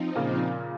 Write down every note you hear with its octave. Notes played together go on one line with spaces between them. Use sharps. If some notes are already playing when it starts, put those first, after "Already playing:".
Already playing: F3 C4 D#4
A#2 C#3